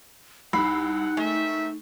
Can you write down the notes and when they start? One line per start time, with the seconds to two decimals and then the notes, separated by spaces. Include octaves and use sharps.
0.53 C2 D#4 F#5 B5 E6 C7
1.17 G#3 A3 C4 A#4 E5